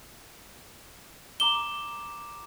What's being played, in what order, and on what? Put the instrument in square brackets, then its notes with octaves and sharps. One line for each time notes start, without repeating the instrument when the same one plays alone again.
[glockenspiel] A#5 D6 E7 [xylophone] G7